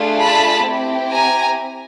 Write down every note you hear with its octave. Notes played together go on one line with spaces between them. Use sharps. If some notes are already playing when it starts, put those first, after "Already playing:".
Already playing: A3 D4 F4 G#4
A5 B5
C4 E4 G4
G#5 A#5